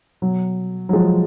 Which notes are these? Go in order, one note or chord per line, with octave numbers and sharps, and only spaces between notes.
B2 F#3
F#3
F3 G#3